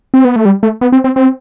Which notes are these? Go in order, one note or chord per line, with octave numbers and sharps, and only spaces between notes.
C4
B3
A3
G3
A3
B3
C4
C4
C4